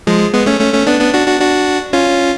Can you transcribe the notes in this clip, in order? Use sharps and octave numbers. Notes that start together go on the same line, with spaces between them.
F3 G#3
G#3 B3
A3 C#4
A3 C#4
A3 C#4
B3 D4
B3 D4
D4 F#4
D4 F#4
D4 F#4
C#4 F4